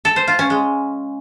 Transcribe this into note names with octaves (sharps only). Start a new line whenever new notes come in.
A4
C5
F4
C#4
G#3